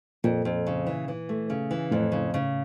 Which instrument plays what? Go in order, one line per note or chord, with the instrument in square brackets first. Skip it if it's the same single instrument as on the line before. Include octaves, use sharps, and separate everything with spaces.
[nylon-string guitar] F2 [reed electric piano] A#2
[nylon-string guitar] F2
C#3
E3
E3
A3
C#3
E3
[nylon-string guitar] F2 [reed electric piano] A2
[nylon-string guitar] C#3
C#3